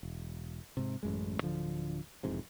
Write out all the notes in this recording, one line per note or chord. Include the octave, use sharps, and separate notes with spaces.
E1
G#2 C3
A1 F#2 G#3
D1 D3 F3
E1 F2 G#2 C3